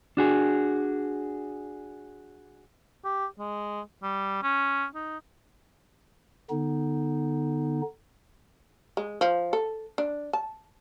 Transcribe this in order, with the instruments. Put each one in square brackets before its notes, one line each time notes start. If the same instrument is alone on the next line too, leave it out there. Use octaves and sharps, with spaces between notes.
[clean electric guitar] D4 F#4 G#4
[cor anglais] G4
G#3
G3
C#4
D#4
[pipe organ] D3 B3 D#4
[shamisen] G#3
F3
A4
D4
A5